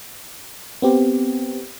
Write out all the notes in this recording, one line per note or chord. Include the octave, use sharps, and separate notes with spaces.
B3 C4 G4